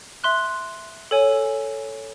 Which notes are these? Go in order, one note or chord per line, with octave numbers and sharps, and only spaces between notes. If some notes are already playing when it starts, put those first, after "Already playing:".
E5 C6 F#6
A4 C#5 G#5